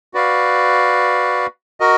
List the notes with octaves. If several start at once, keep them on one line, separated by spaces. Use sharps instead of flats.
F#4 B4 D5 F5
F#4 A#4 D#5